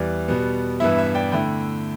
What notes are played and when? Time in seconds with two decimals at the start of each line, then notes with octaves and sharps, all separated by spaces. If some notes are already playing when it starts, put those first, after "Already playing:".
Already playing: E2 E3 G3 D5
0.28 B2 G3 B3
0.80 G2 E3 B3 E4 E5
0.98 E5
1.15 D5 G5
1.32 D3 A3 E4 G5 B5